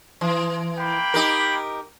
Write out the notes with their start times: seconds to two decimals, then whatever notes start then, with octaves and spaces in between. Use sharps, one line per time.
0.21 E3
0.78 A#3 G5 B5
1.14 D#4 G4 A#4